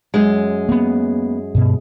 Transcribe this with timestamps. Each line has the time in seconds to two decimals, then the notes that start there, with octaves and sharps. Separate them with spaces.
0.14 F#2 G#3
0.69 A#3 B3
1.55 G2 B2